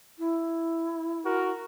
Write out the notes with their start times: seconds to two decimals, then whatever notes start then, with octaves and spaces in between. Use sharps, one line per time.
0.19 E4
1.26 F#4 A#4